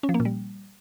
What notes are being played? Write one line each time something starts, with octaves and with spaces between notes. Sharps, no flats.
C#4
F3
A#3
A#2
G3